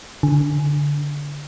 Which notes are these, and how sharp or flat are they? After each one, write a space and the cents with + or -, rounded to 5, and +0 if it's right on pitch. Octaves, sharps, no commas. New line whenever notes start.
D3 -15